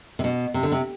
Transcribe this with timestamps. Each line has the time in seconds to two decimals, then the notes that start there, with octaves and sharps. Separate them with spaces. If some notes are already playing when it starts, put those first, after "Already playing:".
0.19 C3
0.24 B2
0.54 C3
0.63 D3
0.72 C3